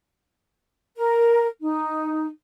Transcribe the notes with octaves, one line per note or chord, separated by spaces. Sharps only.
A#4
D#4